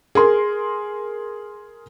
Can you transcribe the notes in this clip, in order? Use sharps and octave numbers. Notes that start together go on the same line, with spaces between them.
G#4 A#4 C6